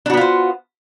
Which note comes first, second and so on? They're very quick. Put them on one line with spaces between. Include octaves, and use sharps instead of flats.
D4 F#4 B3 F4 C5